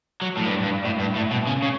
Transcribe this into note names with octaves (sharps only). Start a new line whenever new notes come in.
F#3
A2
G2
G2
A2
G2
A2
B2
C#3
C#3